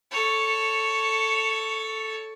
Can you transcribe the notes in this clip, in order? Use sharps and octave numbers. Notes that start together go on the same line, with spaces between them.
A4 C#5